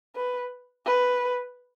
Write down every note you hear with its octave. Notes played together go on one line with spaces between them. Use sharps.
B4
B4